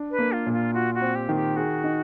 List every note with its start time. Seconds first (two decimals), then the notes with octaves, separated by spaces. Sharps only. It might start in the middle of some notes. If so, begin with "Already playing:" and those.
Already playing: D4
0.11 B4
0.19 A#3
0.32 F4
0.47 A#2
0.53 F4
0.74 F4 F#4
0.94 F#4
1.01 C4
1.15 G4
1.29 D#3
1.35 G4
1.56 F#4 G#4
1.84 D#4